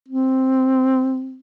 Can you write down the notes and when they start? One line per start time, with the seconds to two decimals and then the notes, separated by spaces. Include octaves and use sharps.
0.08 C4